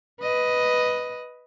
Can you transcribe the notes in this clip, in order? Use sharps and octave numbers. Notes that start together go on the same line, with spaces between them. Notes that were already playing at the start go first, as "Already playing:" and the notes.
B4 D#5